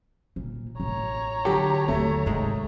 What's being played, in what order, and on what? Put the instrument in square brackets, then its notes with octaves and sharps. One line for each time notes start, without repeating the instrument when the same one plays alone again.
[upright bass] A#2
[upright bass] A1 [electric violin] C#5 A#5
[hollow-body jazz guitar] D3 F#3 A4 [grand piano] G4
[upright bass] D#2 [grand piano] A3
[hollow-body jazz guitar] C2 D#3 G#3 [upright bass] G#2